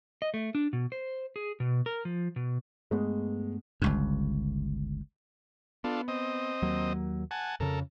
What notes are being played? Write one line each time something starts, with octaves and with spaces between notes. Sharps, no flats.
D#5
A3
D4
B2
C5
G#4
B2
A#4
F3
B2
G2 G#3 A3 B3
G1 C#2 G2
B3 D4 F4 A4
C4 D#5
D#2 F#3 A#3
F#5 G#5 A5
F2 C#3 A4 A#4